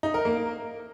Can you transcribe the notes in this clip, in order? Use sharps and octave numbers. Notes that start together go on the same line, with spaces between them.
D#4
A#4
A#3